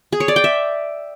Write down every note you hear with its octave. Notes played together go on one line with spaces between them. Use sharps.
G#4
C#5
D5
G5
E5